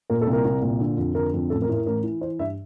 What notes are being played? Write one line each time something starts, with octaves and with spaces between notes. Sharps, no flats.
A#2 A#4
A4
C2
A#4
C2
A#2
D3
F2
D3 A#4
F2
A1 A4
A#4
A2
A#4
A1 A#4
E3
E3 C5
G2 E5